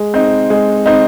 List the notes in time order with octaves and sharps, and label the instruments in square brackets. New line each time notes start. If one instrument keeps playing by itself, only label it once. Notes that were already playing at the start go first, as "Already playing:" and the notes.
Already playing: [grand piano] G#3
C4 D#4
G#3
C4 D#4